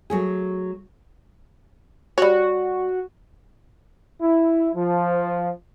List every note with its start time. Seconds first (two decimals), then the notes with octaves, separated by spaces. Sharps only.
0.10 F#3 A3 G#4
2.18 G3 F#4 C#5
4.21 E4
4.75 F3